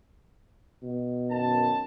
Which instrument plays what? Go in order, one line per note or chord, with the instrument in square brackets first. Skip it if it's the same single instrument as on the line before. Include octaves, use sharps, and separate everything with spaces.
[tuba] B2
[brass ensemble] F#2 D#3 A5